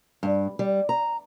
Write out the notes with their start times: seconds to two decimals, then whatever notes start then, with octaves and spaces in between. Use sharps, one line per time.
0.23 G2
0.59 G3
0.89 A#5